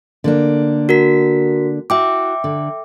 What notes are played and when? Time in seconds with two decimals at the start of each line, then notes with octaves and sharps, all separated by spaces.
0.24 D3 A#3 D4
0.89 F#4 A#4 B6
1.90 E4 F#4 E5 G5 D6
2.44 D3